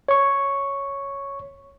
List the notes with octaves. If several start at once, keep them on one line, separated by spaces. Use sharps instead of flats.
C#5 C#6